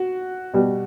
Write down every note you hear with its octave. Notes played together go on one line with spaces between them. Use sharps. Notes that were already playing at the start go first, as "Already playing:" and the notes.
Already playing: F#4
B2 G3